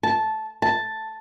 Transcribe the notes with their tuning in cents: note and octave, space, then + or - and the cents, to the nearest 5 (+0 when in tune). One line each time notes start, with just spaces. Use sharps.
A5 -10
A5 +5